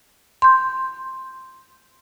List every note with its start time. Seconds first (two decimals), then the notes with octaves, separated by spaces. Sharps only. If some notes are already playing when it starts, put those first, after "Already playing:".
0.42 C6 G6